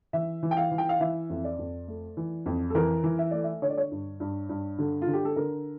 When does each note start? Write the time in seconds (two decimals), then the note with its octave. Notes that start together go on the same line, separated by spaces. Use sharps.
0.13 E3 E5
0.43 E3
0.51 G5
0.57 F5
0.71 E3
0.78 G5
0.89 F5
1.00 E3 E5
1.30 F2
1.44 D5
1.59 F2
1.88 A3
2.17 E3
2.46 F2
2.70 A4
2.75 E3 A#4
3.03 E3
3.19 E5
3.31 A3 D5
3.44 E5
3.62 D3 C#5
3.70 D5
3.78 C#5
3.91 G2
4.20 G2
4.49 G2
4.78 D3
5.02 F4
5.07 D3
5.13 G4
5.25 A4
5.36 D3 A#4